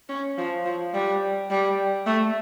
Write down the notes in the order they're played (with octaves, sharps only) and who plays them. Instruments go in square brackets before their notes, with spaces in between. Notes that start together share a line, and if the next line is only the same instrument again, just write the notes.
[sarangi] C#4
F3
F3
G3
G3
A3